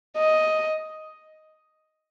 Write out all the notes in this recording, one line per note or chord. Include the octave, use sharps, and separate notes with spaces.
D#5